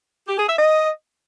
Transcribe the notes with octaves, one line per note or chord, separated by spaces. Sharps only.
G4
G#4
E5
D#5